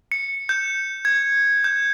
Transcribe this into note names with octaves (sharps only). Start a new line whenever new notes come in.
C#7
G6
G#6
G6